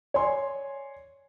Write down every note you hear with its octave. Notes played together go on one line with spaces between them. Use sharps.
C#5 D5 G#5 C6